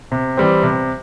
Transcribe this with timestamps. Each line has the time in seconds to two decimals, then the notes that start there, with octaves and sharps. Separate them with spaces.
0.12 C3
0.37 E3 G3 C4
0.63 C3